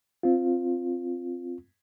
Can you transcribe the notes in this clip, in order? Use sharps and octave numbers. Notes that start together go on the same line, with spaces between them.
C4 F4